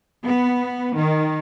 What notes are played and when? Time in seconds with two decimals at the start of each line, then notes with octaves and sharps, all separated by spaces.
0.24 B3
0.95 D#3